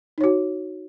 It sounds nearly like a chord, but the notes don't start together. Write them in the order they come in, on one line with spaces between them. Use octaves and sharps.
D#4 C#5 F#4